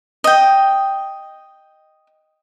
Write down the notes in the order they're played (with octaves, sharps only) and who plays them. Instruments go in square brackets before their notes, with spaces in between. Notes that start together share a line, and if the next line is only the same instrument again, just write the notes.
[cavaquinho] D#5 G5